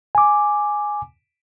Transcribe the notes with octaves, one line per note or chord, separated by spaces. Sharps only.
G#5 D6